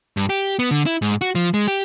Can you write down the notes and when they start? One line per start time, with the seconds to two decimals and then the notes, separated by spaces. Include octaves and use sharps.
0.17 G2
0.30 G4
0.59 B3
0.71 D3
0.86 E4
1.02 G#2
1.21 F#4
1.35 F3
1.54 G#3
1.68 G4